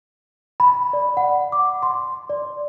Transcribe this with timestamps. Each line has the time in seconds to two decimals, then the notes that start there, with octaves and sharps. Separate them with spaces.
0.60 B5
0.93 D5
1.17 F#5
1.52 D6
1.83 C6
2.30 D5